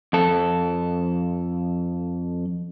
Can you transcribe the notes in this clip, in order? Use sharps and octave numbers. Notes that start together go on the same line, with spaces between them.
F2 A4